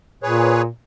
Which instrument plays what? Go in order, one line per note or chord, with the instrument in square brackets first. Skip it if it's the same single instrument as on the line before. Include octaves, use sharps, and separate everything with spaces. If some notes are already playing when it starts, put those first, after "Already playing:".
[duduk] A#2 [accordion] G#4 B4 C#5